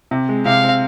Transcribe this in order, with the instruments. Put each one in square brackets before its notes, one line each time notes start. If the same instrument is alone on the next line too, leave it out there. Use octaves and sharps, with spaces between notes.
[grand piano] C3
G#3
[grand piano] C3 [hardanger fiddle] F5
[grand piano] C4